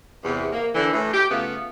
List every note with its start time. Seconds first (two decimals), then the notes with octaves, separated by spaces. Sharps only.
0.24 E2 C3
0.52 A#3
0.75 D3 E3
0.93 A2 E3
1.13 G4
1.31 C#3 A3 B3 F4